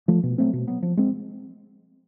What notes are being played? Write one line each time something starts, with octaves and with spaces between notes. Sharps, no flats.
F3 A3
B2
F#3 A3 C4
B2
F#3 B3
F3
G#3 C4